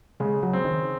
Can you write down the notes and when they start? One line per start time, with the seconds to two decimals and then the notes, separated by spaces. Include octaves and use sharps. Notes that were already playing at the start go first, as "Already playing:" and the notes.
0.20 C#3 G#3
0.43 F#3
0.53 C4
0.65 D#3